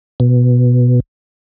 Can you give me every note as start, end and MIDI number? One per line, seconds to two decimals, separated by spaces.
0.20 1.00 47